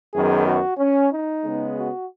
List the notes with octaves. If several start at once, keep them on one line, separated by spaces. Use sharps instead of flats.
F#2 D#3 F#3 B3 G#4
F#4
C#4
D#4
C#3 G#3 B3
F#4